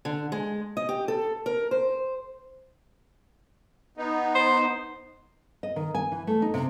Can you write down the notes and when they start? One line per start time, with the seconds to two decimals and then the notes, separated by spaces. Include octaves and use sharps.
0.05 D3
0.32 G#3
0.77 D#5
0.89 G4
1.08 A4
1.46 A#4
1.71 C5
3.97 B3 D#4
4.35 C5
5.63 D#5
5.76 D#3
5.95 G#5
6.12 E3
6.27 A3
6.42 D#4
6.54 C3